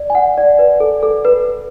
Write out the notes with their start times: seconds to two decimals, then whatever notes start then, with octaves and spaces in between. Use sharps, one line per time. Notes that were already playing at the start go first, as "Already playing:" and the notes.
Already playing: D5
0.10 G#5
0.15 F#5
0.38 D5
0.59 B4
0.80 A4
1.03 A4
1.25 B4